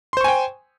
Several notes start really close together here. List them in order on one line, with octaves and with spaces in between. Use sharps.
C6 C5 C#6 G#5 G5